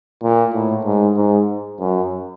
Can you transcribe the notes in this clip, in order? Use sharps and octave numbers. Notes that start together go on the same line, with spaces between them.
A#2
A2
G#2
G#2
F#2